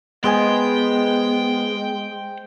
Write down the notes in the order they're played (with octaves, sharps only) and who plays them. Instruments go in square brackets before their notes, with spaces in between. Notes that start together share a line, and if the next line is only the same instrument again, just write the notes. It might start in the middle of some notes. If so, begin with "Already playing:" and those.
[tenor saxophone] G#3 [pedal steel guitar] B3 [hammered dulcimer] C5 D#5 G#5 [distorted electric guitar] G5